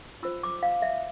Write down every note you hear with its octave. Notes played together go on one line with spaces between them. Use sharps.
F4 C5 E6
D6
F5
E5